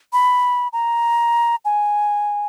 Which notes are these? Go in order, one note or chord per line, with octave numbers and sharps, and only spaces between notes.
B5
A#5
G#5